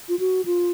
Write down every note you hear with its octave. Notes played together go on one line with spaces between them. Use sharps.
F4
F#4
F4